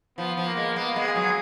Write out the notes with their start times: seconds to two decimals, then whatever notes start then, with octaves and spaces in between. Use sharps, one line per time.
0.18 F3 B3
0.37 F3
0.47 A#3
0.57 G#3
0.76 A#3 B3
0.96 G#3
1.06 G#4
1.16 F#3